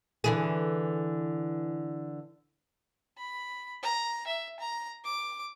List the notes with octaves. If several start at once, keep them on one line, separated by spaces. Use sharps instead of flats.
D3 E3 G#4
B5
A#5
E5
A#5
D6